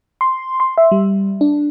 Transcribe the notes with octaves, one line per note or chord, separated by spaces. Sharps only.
C6
C6
E5
G3
D4